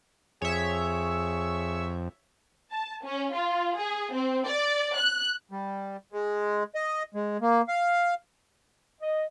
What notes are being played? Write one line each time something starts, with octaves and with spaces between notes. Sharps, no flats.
F2 G#4 C#5 E5
A5
C#4
F4
G#4
C4
D5
F#6
G3
G#3
D#5
G#3
A#3
F5
D#5